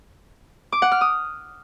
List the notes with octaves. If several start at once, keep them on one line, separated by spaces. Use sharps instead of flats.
D6
F#5
F6
D#6